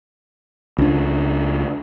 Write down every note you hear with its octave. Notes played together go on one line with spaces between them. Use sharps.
C#2 D4